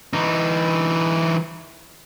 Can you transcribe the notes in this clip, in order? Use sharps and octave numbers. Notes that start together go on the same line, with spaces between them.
E3 D#4